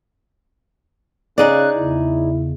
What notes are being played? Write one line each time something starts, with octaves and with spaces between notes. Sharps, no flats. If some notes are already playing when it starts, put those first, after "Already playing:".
C#3 D#4 G#4 D5 F#6
E2 C#3 E4